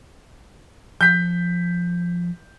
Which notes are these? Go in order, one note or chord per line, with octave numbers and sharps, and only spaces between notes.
F3 G6 B6